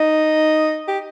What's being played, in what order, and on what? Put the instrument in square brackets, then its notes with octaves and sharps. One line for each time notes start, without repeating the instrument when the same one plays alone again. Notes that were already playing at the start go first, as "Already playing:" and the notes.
Already playing: [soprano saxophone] D#4
G4